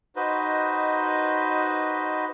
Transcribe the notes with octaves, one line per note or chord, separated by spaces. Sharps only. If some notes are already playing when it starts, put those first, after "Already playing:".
D#4 F#4 B4 C5 D#5